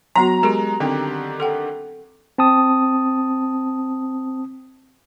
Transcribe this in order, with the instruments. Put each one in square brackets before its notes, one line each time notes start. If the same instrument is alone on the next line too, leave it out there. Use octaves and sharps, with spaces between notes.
[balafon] F#3 B3 F#4 [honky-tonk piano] A#5
[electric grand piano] G#3 [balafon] G4 A#4
[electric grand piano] D3 D#3 G4 [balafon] C4
[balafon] A4 F#5 G5
[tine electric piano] C4 A5 D#6